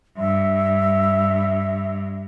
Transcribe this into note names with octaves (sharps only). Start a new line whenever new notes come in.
G2 E5